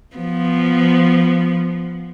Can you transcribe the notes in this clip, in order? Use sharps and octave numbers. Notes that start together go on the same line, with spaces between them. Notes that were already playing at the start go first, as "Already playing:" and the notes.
F3 B3